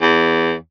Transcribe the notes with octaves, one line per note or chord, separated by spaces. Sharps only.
E2